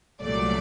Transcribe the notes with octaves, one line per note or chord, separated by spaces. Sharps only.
C2 A#2 F#3 A3 D5